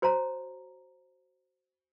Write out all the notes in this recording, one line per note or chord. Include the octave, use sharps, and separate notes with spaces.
F#4 C5 C#5 A5 A#5